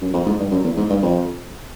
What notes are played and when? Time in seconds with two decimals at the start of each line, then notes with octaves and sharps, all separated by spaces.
0.01 F#2
0.13 F2
0.26 G#2
0.39 G2
0.51 F#2
0.64 E2
0.77 G#2
0.90 G2
1.03 F2